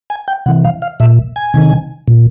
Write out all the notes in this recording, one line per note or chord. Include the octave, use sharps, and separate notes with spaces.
G#5
G5
C3 E3 F#5
F5
F5
A#2 E5
G#5
C3 D#3
A#2